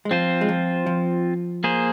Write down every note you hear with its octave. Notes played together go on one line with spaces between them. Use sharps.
G#3
F3 C4 F4 C5
G#3
F3
F3
A#3 G#4 C5